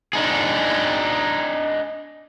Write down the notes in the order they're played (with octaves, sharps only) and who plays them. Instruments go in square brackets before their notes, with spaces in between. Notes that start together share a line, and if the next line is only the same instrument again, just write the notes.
[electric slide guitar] D4 D#4 G#4